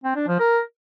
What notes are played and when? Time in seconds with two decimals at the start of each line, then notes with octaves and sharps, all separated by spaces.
0.04 C4
0.16 D4
0.28 F3
0.40 A#4